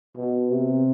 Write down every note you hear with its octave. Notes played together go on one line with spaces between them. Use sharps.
B2
C3